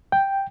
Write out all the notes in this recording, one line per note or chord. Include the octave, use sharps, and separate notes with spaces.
G5